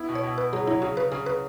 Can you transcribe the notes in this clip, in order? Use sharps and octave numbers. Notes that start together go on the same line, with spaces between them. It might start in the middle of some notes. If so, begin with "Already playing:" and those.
Already playing: B3 E4
B2
C#5
B2
B2 B4
F#3 G#4
F#3 E4
C#3 F#4
C#3 B4
C#3 G#4
C#3 B4